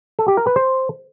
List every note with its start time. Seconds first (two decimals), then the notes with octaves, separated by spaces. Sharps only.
0.19 A4
0.28 G4
0.37 A#4
0.47 B4
0.56 C5